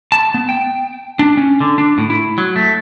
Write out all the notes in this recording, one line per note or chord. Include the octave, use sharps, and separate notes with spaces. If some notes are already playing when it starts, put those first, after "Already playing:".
A5
B3
G5
D4
C#4
D3
D4
A2
E4
F#3
A3